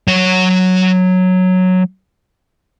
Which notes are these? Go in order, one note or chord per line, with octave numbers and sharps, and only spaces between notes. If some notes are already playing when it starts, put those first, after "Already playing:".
F#3 C#5